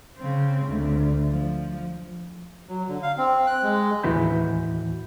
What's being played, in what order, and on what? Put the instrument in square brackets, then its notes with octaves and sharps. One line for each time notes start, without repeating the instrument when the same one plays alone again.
[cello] C#3 C4
D2
F3
[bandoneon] F#3
D3
F5
C4
F#6
G#3
[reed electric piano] D#2 A2 E3 F#4 B5 G6